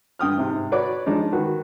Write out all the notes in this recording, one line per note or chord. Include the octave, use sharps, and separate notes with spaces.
G2 G5 D#6 F6
G#2 C3
F#4 B4 C#5 D5 D6
F3 G#3 D4 D#4
D#3 F#4 B4